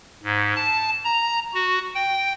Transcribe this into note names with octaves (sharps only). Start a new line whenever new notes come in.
G#2
A5
A#5
F#4
G5